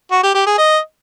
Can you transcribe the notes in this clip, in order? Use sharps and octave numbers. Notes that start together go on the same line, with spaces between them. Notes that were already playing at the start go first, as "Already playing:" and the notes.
F#4
G4
G4
G#4
D#5